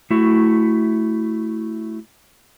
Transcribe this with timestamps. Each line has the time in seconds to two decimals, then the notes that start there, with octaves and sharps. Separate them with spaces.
0.11 A3 E4 F#4